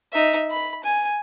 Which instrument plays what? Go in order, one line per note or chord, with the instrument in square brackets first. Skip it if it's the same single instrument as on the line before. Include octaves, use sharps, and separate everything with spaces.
[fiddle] D#4 E5
B5
G#5